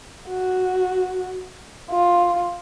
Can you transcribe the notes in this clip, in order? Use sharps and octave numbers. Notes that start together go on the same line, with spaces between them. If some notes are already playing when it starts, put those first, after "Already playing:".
F#4
F4